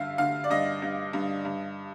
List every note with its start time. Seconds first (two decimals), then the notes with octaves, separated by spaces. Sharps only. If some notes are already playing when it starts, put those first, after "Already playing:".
Already playing: G2 D3 E5 F5
0.18 D3 F5
0.44 D5
0.50 G2 D#5
0.82 G2
1.13 G2
1.45 G2